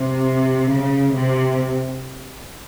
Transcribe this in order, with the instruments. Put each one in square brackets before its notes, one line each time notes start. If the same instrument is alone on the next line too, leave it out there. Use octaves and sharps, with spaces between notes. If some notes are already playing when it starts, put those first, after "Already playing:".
Already playing: [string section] C3
C#3
C3